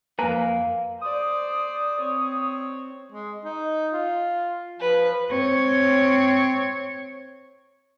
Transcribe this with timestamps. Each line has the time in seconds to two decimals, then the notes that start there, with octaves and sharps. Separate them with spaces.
0.19 F2 A#3 B4 F5 G#5 A#5
1.01 C5 D5 D#6
2.01 C4 C#5
3.12 G#3
3.45 D#4
3.93 F4
4.80 F3 B4
5.30 C4 C#5